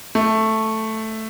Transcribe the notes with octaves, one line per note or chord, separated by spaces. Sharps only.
A3